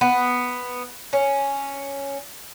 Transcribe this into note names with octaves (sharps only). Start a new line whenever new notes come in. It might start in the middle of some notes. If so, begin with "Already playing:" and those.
B3
C#4